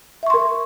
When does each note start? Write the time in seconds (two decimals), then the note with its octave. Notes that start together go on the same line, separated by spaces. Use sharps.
0.23 E5
0.27 C#6
0.30 C6
0.34 A#4